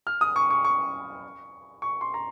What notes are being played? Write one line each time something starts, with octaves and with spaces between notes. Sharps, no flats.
F6
D#6
C#6
C#6
C#6
C#6
C6
A#5